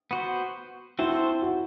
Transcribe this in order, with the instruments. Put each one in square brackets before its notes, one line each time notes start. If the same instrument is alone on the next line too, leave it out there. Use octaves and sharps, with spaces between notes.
[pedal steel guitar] B3 F#4 C5
[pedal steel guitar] C4 F#4 A4 C5 [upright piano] E4
[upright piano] F#4